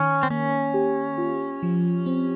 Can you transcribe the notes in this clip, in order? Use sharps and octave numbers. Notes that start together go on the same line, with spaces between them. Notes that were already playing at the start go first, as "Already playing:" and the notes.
Already playing: D#3 C#4
C4
A#3 C#4
G4
F4
F3
C4